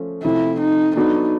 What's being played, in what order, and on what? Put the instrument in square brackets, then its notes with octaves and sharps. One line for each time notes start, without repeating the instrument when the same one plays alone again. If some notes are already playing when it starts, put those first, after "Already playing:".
Already playing: [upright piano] F3 A3 C#4
[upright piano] C3 F3 A3 [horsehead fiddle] E4
[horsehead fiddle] D#4
[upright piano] F#3 B3 D4 F#4 A4 [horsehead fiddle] D#4